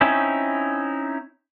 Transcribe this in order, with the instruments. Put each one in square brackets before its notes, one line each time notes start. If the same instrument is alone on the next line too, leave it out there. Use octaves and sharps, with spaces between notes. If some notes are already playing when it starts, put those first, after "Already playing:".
[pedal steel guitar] C4 C#4 D#4 E4